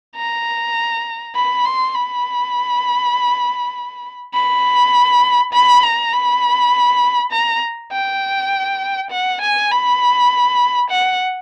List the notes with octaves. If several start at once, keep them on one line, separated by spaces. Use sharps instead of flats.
A#5
B5
C6
B5
B5
B5
A#5
B5
A#5
G5
F#5
G#5
B5
F#5